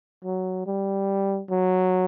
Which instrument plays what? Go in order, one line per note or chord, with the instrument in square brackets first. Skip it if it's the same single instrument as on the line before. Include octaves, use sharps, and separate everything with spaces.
[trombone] F#3
G3
F#3